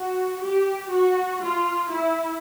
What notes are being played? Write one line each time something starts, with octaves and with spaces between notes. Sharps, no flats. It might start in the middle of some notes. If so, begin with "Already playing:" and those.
Already playing: F#4
G4
F#4
F4
E4